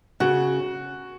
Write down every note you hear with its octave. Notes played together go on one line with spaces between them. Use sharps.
C#3 F#4